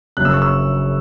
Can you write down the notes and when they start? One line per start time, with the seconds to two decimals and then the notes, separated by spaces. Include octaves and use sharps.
0.17 F#1 F#2 C#3 F#6
0.25 E6
0.33 C#6
0.42 E6